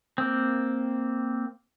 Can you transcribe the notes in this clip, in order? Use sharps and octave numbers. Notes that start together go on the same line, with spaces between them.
A#3 C4